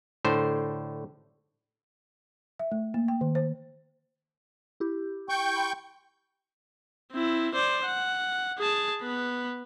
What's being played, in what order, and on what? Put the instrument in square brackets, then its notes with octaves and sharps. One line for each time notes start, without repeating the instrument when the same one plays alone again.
[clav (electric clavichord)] A2 D3 C5
[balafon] E5
A3
A#3
G5
D#3
C5
[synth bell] E4 G4
[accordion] G5 C#6 G6
[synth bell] B5 C6
[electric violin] C4 E4
C5 D5
F#5
G#4 A5
B3 B4